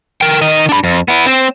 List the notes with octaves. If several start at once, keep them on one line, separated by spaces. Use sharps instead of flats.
A#4 G5
D#3 D#5
D4 B5
F2
B3 E4
C4 C5